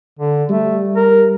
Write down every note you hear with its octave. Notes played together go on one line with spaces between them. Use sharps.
D3
G3 A3
A#4